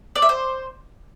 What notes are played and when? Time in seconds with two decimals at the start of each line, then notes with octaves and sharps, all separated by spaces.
0.15 D5
0.22 E5
0.29 C5